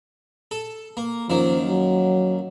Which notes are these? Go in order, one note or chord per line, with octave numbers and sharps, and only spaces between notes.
A4
A#3
F#2 D#3 F3 A#3
F#3